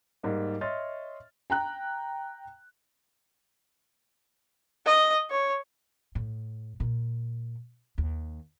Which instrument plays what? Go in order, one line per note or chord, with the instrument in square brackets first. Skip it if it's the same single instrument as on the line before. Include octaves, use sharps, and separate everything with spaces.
[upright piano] G#2 G3 A#3
C#5 D#5 E5 C6 F6 A6
[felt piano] G5 A#5 F#6
[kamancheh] D#5
C#5
[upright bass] A2
A#2
D#2